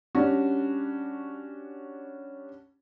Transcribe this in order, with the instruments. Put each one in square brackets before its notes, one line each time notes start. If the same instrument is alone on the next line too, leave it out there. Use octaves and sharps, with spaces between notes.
[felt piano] G3 C#4 D4 F#4